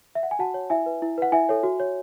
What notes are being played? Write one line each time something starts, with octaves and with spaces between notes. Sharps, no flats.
E5
F#5
G#5
F#4 F#5 A5
C#5
E4 E5 G#5
B4
E4
B4 F#5
E4 E5 G#5
A4 C#5
F#4
C#5